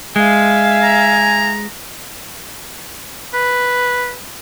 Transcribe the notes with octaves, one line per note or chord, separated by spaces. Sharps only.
G#3 E5 F5 G#5
A#5
B4